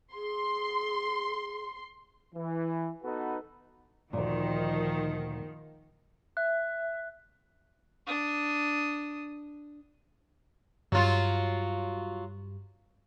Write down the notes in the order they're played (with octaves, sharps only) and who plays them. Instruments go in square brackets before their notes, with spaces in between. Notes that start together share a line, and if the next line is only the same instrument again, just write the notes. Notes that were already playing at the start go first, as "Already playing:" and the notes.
[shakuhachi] G#4 [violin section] C6
[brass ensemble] E3
B3 D#4 F#4 A4 B4
[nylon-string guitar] D2 A#2 [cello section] D#3 F3
[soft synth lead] E5 [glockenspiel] F#6
[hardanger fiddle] D4 D#6
[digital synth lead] G2 [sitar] F#3 F4